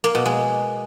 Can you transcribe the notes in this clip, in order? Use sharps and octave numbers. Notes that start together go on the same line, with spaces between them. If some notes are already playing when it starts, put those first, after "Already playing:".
A#3
B2
G#3